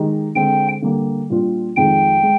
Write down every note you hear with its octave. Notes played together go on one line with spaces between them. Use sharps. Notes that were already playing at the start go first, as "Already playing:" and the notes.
Already playing: D#3 G#3 D#4 G4
D3 G#3 C4 G5
D3 G3 A#3
A#2 G3 D4 F4
F2 D#3 G#3 D#4 G#4 G5
G#3